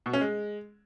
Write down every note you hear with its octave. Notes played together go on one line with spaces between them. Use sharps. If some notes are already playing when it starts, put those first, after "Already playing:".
B2
C#4
G#3